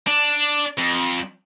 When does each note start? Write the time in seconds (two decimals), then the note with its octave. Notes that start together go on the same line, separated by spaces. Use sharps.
0.07 D4
0.78 F2